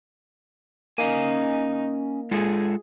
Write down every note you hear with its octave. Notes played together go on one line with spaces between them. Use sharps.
A#3 C#4 D#4 F5 G#5
G#3 F4 G#4 A4